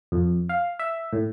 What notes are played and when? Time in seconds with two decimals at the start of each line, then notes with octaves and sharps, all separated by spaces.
0.12 F2
0.49 F5
0.79 E5
1.13 A2